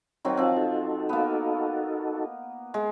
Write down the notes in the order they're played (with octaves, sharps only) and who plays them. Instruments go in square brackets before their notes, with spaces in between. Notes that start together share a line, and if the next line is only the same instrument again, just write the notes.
[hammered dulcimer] D#3 F#3 C4
F3 C4
[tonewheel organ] D#4 F#4 A4
[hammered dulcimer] A#3 B3
G#3